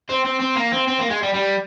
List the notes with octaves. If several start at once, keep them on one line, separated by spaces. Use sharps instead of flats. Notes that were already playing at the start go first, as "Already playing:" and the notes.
C4
C4
C4
A#3
C4
C4
A#3
G#3
G3
G3